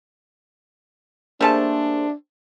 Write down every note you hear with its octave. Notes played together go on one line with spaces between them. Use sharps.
G3 A3 A#3 D4 G#4 C5 A5